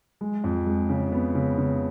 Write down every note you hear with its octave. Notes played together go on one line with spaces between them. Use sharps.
G#3
F2
G#3
C#3
B3
C#3
C#3